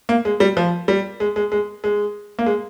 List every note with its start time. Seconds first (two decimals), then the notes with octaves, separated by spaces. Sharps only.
0.09 A#3
0.25 G#3
0.40 G3
0.57 F3
0.88 G3
1.20 G#3
1.36 G#3
1.52 G#3
1.84 G#3
2.39 A#3
2.46 G#3